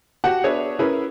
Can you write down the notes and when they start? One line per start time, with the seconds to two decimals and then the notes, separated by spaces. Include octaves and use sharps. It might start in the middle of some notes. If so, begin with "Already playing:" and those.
0.24 F#4 G4 F#5 A5
0.43 B3 D4 G#4 B4 C#5 E5
0.79 C#4 E4 G#4 A#4 B4